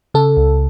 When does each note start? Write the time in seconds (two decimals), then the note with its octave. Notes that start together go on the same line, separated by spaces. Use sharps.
0.14 C#3 A4
0.37 C#2